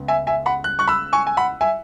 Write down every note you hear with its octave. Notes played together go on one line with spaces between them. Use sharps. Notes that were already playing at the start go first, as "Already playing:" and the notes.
Already playing: C#2 C#3 B3
E5 G#5
E5 G#5
F#5 B5
F#6
C#6 F#6
B5 E6
G#5 C#6
G#5
F#5 B5
E5 G#5